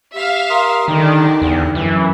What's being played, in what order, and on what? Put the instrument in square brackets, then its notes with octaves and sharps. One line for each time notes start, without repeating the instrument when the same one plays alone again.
[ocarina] G4 [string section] E5 F5
[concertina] A#4 C6 D#6
[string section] D3 D4 [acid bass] D#3 [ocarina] D#4 [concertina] G4
[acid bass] E2
[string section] F#2 [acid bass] E3